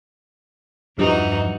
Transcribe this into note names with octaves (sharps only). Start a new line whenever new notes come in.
E2 G2 E3 F3 D#4 F#4